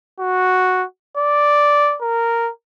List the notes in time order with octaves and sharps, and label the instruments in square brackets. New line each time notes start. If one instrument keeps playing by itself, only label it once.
[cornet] F#4
D5
A#4